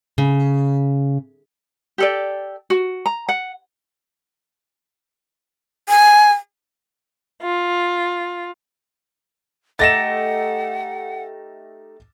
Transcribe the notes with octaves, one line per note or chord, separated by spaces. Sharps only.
C#3
G4 A4 D5
F#4
A#5
F#5
G#5
F4
A3 D#4 G4 F#5 A6 A#6 E7